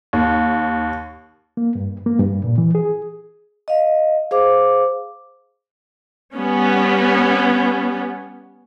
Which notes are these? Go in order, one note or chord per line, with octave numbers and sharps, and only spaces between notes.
D#2
A#3
G2
A#3
G2
A#2
E3
G#4
D#5 F5
G#4 C5 F5 D6
G3 B3 C#4